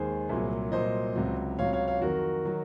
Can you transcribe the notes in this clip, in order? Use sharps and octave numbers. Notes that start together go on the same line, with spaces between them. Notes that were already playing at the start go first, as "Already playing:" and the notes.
Already playing: D#2 D#3 G#3 G#4 C5
C2 A#2 F#3
C2 A#2 F#3 C5 D#5
C#2 C3 F#3
C#2 C3 F#3 C#5 F5
C#5 F5
C#5 F5
F2 D#3 F#3 F#4 A#4
D#3 F#3